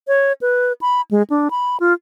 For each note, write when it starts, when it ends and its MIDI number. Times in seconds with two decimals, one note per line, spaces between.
0.08 0.33 73
0.41 0.73 71
0.81 1.01 83
1.11 1.23 56
1.30 1.48 62
1.51 1.77 83
1.80 1.93 65